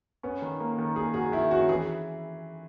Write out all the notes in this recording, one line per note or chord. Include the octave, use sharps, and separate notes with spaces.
B3 C#4
D#3
A#3
D#3
A#3 G#4
F#4 G#4
D#3 E4
C#4 F#4
E3 G#4